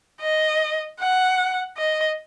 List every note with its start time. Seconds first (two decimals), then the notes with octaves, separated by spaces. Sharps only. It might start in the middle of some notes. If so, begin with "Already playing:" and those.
0.21 D#5
1.00 F#5
1.77 D#5